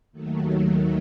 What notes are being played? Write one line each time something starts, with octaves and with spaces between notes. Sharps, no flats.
D#2 D#3 F#3 A3